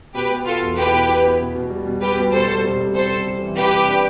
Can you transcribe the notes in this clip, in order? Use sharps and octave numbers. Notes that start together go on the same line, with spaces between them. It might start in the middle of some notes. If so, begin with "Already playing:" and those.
B2 G4 B4
B3
B3 F4 A4
E2
E4 G4 B4
B2
E4
B3
B2
B2
G3
B2
G3 G4 B4
B2
B2 A4 C5
G3
C3
G3
C3 A4 C5
C3
C3
E3
C3 G4 B4
C3
D4